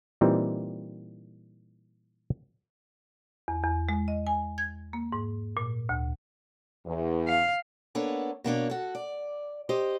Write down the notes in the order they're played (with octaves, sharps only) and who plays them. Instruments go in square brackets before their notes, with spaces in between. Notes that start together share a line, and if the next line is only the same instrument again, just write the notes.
[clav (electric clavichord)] A#2 E3 G3 C4 D#4
[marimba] E2
E2
G#3
D#5
G#5
G#6
A#3
G#2
A#2
D2
[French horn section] E2
[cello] F5
[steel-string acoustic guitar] A#3 B3 D4 A4 C#5
B2 A#3 D4 C#5
F#4 A4
D5
G4 C5 D#5